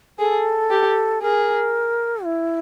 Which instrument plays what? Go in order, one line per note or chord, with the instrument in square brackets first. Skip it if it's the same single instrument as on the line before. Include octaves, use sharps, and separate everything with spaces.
[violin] G#4 [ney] A4
[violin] G4
[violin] G#4 [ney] A#4
[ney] E4